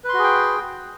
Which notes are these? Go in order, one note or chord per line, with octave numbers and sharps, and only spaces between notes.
F#4 G#4 B4 G5 C6